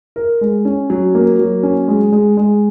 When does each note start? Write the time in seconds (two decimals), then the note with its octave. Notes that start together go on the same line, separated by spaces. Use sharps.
0.16 A#4
0.41 G#3
0.65 C#4
0.90 F#3
1.15 A#3
1.39 F#3
1.63 C#4
1.88 G#3
2.12 G#3
2.37 G#3